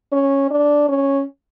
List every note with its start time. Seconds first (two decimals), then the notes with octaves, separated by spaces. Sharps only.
0.12 C#4
0.51 D4
0.89 C#4